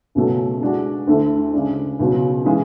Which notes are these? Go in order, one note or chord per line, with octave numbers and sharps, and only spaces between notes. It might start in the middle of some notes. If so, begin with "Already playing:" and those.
C#2 B2 F#3 A3
G#3 D4 F#4
D2 D3 A3 E4
C#3 G#3 D4
C#2 B2 F#3
C#3 E3 G#3